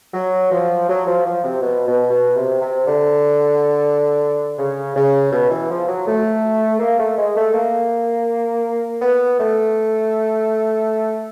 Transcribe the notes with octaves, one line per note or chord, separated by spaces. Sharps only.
F#3
F3
F#3
F3
F3
C3
B2
B2
B2
C3
C3
D3
C#3
C#3
B2
E3
F3
F#3
A3
A#3
A3
G#3
A3
A#3
B3
A3